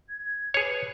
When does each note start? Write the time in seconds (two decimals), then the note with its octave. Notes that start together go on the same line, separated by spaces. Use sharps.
0.09 G#6
0.54 G#4 B4 C#5